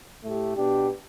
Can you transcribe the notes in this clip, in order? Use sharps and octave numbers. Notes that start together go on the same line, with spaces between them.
A2 A3 G4
B2 B3 D4 G4